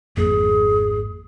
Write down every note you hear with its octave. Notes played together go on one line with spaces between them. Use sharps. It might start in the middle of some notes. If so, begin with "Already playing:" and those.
G#1 F2 A#3 G#4